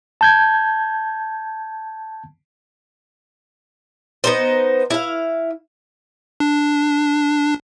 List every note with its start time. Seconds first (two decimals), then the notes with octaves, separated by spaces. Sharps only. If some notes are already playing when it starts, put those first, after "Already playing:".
0.21 A5 G6 G#6
4.24 B3 D#4 C5
4.90 E4 F5
6.40 D4